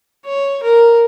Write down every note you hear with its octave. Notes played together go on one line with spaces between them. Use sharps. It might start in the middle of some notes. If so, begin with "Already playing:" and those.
C#5
A#4